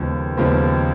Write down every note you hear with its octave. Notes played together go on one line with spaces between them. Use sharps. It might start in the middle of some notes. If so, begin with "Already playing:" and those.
Already playing: D#2 C#3 F3 G#3 B3
D#2 C#3 F3 G#3 B3